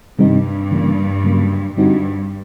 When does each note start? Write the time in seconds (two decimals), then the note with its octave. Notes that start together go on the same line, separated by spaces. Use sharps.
0.19 G2 C3 D#3 G3 C4 D#4
0.71 C#3 E3 G3 A#3
1.24 C#3 F#3 A#3
1.77 G2 D3 G3 C4 D#4 F#4